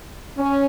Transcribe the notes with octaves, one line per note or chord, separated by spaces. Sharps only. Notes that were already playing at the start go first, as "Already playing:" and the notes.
C#4